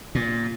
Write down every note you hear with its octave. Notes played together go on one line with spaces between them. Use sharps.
A#2